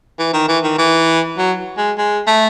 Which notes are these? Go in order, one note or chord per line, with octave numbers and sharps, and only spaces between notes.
E3
D#3
E3
D#3
E3
F#3
G#3
G#3
A3